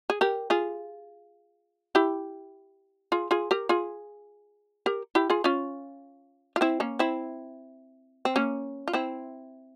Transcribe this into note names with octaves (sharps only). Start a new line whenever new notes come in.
G#4
G4 A#4
F4 G#4
E4 G4
F4 G#4
F4 G#4
G4 A#4
F4 G#4
G4 A#4
E4 G4
F4 G#4
C#4 F4
F4
C4 E4
A#3 C#4
C4 E4
C4
A#3 C#4
F4
C4 E4